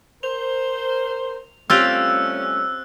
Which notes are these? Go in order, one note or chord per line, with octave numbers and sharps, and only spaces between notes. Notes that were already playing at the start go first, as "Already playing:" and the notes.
A#4 C5 F7
G3 A3 C4 C#4 F4 G4 E6 F#6